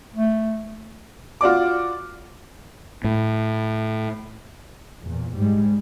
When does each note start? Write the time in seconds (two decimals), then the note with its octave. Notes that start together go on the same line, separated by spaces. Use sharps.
0.15 A3
1.41 F4 F#4 D5 D6
3.04 A2
5.06 E2 A#2
5.37 G#2 G3 G#3